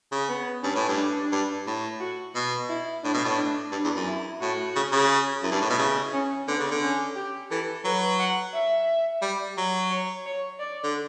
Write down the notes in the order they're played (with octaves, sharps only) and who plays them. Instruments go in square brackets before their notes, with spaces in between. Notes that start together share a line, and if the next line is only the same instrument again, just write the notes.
[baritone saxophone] C#3
[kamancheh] B3
[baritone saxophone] G2 [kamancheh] C#4
[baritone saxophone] A2
G2
[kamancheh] D4
[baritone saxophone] G2
A2
[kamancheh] F#4
[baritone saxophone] B2
[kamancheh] E4
[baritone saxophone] A2 [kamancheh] D4
[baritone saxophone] B2
A2
[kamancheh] D4
[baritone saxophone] G2 [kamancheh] D4
[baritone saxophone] E2
F#2
[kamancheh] E4
[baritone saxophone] A2 [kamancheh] F#4
[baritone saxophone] C#3
C#3
[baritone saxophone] F#2 [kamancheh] E4
[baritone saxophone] G2
A2
B2
[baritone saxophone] C#3 [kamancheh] E4
[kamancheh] C#4
[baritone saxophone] D3 [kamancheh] B3
[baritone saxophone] C#3
D3
[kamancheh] C#4
G4
[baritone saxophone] E3 [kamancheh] A4
[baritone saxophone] F#3 [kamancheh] B4
[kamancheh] F#5
E5
[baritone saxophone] G3
F#3
[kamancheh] C#5
C#5
D5
[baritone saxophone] D3